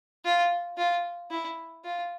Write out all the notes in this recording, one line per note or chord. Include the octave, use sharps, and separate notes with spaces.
F4
F4
E4
F4